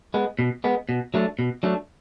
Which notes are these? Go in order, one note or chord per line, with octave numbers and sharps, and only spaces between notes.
G#3 B3
B2
G#3 B3
B2
F#3 A3 D4
B2
F#3 A3 D4